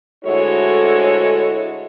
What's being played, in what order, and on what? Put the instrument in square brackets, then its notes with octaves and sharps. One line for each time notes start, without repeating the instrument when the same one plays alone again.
[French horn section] D2 G#3 E4 F#4 A4 C#5